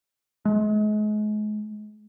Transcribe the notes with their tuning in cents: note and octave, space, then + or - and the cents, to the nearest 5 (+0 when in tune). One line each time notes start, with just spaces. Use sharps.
G#3 +35